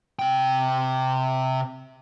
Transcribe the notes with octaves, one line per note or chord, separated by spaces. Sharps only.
C3 G5